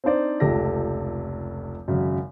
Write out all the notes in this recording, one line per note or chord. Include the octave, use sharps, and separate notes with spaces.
C4 D4 D#4 C5 D5
F1 C#2 G4 A4 A#6
G#1 F#2 C#3 F#3